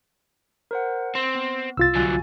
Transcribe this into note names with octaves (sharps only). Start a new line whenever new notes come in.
A#4 C5 F#5
C4 C6
B3
C2 F4 E6 A6
D3 F#3 F#4 G#5